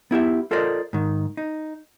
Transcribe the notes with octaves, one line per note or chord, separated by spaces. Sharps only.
B3 E4 G4 E5
F4 A4 A#4 C5 D5 D#5
G#2 D#3
D#4